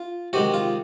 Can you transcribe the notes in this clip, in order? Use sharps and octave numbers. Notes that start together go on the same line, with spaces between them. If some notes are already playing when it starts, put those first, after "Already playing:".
Already playing: F4
C3 D#3 G#3 F#4
F4